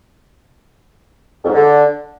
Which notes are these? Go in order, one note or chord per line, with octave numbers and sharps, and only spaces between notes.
F2
G#2
D3